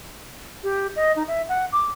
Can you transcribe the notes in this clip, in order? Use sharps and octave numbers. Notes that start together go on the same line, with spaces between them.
G4
D#5
D#4
E5
F#5
D6